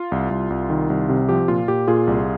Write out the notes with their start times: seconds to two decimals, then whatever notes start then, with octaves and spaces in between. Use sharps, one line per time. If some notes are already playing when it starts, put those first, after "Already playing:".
Already playing: F4
0.12 C2
0.31 C2
0.50 C2
0.70 D#3
0.90 C2
1.09 C3
1.29 F3 G4
1.48 A#2 F4
1.68 A#2 G4
1.87 A#2 F4 G#4
2.07 C2